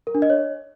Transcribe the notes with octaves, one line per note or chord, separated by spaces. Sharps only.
A#4
D4
D#5
C#5